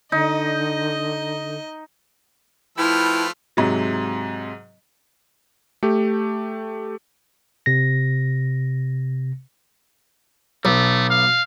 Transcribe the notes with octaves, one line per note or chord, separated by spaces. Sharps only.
D3 D#4 D#5
F3 A3 E4 B4 G5 B5 F6
G#2 C3 F#3
A3 G4
C3 A#6
B1 A3
F5